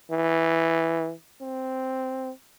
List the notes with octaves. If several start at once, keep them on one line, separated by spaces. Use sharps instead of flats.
E3
C4